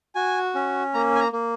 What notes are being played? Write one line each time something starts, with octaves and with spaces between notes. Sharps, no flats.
F#4 G#5
C#4
A#3 A#5
G#5
A#5
A#3